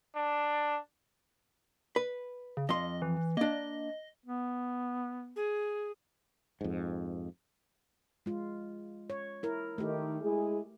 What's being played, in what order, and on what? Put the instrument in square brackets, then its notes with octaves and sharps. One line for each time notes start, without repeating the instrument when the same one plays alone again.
[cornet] D4
[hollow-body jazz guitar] B4
[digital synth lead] C#3
[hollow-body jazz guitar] F2 C6 [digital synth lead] D#5
[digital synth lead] E3
[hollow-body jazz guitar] A#3 D4 [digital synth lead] D#5
[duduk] B3
[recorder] G#4
[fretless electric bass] F2 G#2
[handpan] G#3 F4
C#5
E4 A#4
[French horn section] D#3 [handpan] A3 G4
[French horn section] G#3 E4 G#4